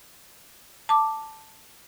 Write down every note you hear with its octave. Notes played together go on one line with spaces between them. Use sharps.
A5 D6